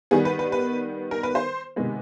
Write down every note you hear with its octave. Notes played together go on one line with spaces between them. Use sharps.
D#3 G3 B3 G#4
B4
B4
B4
A#4
B4
C5
C3 D#3 G#3 B3